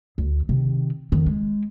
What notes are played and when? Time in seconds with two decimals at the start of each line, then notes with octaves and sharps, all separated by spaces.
0.18 D2
0.49 C3 D#3
1.12 F2 D#3
1.26 G#3